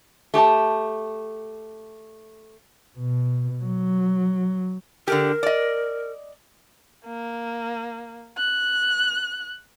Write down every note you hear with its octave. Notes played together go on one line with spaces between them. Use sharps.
A3 G4 G#5 A5
B2
F#3
D3 G4 A#4
D5 D#5
A#3
F#6